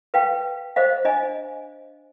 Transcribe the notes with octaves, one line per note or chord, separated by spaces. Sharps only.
B4 F5 G5
C5 D#5 F5
D4 D#5 G#5